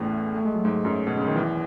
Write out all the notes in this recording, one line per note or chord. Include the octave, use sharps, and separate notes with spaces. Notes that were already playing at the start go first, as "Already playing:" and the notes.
Already playing: E2 A2 C#3 E3 A3
A3
G#3
F#3
G#2 G#3
F#2 F#3
B2
C#3
D#3
E2 E3